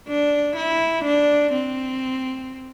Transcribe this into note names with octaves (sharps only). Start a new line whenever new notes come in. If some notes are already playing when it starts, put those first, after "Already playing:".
D4
E4
D4
C4